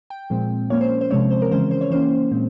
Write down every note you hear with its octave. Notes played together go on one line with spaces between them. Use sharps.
G5
A#2 F3 G#3 C4
F3 A#3 C#4 C#5
C5
C5
C3 F3 G#3 C4 C#5
C5
A#4
C#3 E3 G#3 C#4 C5
C5
C#5
E3 A#3 C#4 C5
A#2 G#3 C4